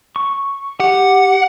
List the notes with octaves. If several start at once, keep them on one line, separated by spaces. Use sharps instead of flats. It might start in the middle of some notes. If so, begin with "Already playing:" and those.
C#6
G4 F#5